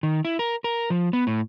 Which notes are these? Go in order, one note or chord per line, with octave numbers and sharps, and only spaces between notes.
D#3
E4
A#4
A#4
F3
B3
A2